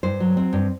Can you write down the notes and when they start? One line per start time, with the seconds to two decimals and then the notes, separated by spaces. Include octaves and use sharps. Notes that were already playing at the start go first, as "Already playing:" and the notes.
0.03 G2 C5
0.20 F#3
0.37 C4
0.53 G2